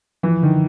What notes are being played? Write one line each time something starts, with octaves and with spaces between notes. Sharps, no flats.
E3 F3
D3 D#3